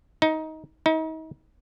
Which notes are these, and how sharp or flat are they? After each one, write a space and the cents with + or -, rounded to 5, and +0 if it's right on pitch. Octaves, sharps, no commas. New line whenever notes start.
D#4 +20
D#4 +40